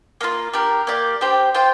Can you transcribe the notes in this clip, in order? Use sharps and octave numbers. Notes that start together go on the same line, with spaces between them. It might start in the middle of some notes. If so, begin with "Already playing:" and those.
A#3 D4 F4
D4 G4 A#4
A#3 G4 D5
D4 G4 C5 G5
F4 C5 G5